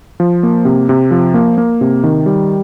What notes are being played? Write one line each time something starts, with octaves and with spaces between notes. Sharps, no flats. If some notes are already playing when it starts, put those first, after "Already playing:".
F3
A#3
C3
C3
F3
A#3
A#3
C3
D#3
G3